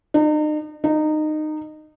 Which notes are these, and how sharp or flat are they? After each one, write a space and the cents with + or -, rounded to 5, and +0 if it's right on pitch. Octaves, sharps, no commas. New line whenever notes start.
D#4 -40
D#4 -20